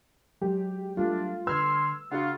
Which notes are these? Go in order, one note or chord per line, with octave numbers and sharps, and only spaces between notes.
F#3 G#3 G4
G3 A3 D4 F4
D3 B4 C6 E6 F6 G#6
C#3 D4 F4 F#4 G#4 F#5